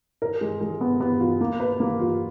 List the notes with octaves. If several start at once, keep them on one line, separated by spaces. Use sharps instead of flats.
A#4
G#3
G#3
B3
B3
F4
A#3
B4
A#3
F4